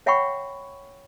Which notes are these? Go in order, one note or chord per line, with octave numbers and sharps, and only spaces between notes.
C#5 E5 F#5 G5 B5 C#6